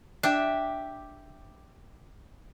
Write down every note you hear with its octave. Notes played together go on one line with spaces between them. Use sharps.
D4 G4 E5 G5